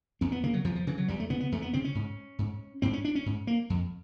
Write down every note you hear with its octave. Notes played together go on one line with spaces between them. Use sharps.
E2 C4
B3
C#3 A#3
F#3
E2 F3
F3
C#3 E3
F#3
E2 G3
A3
C#3 B3
B3
E2 A3
B3
C#3 C4
C#4
G#2
G#2
G#2 C4
C#4
D4
C#4
G#2
A#3
F2